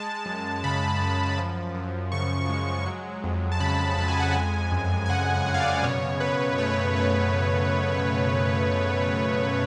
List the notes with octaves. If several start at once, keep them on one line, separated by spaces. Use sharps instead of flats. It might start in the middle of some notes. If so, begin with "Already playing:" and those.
Already playing: G#3 A5
F#2
C#3 B5
F#2
F3
F#2
C#3 C#6
G#3
F#3
F2
A5
C#3 B5
F2 A5
G#5
F#5
G#3 G#5
F#2
G#5
C#3 F#5
F#2 F#5
F5
D5
F5
B2 C#5
B2 B4
A3 C#5
B4
A3 B4